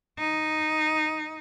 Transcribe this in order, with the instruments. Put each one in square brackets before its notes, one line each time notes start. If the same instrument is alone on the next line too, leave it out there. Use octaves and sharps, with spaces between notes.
[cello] D#4